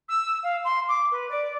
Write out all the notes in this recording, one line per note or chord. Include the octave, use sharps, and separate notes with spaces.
E6
F5
C6
D6
B4
D5